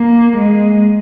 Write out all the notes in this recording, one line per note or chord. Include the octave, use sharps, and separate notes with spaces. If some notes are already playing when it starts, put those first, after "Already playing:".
Already playing: A#3
G#3